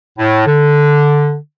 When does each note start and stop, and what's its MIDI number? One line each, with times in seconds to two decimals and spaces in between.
0.18 0.43 45
0.46 1.35 50